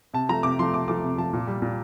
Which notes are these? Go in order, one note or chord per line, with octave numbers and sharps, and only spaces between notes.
C3 A5
F3 A3 A#5
C3 D6
F3 A3 C6
C3 D6
F3 A3 D6
C3
F3 A3 A5
A#2
G3
A#2